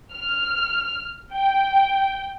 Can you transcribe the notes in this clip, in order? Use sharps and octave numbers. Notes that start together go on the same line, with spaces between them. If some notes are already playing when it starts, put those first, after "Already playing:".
F6
G5